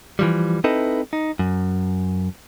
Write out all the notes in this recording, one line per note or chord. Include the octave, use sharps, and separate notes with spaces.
E3 F3 G3
C4 D#4 E4 A4 B4 D#5
D#4
F#2